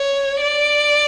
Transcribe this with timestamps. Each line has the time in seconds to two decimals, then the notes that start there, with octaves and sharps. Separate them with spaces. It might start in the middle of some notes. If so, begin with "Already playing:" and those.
Already playing: C#5
0.41 D5